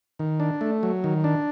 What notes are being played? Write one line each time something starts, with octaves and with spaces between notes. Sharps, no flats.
D#3
D4
A3
F#3
D#3
D4